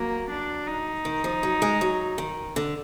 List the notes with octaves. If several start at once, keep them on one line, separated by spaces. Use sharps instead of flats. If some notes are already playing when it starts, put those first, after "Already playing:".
Already playing: F#3 A#3
D4
D#4
D#3
F3
F#3
G#3
F#3
D#3
D3